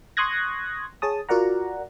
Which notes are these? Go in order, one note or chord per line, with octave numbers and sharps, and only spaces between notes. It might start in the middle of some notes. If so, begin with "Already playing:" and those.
C6 C#6 D#6 F#6 G#6 A#6
G#4 C#5 A5 D#6
F4 F#4 A#4 D5 F#5 A#5